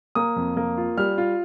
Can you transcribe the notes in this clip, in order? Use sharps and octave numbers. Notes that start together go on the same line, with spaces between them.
A#3 D#6
F2
A#3
F4
G3 F6
F4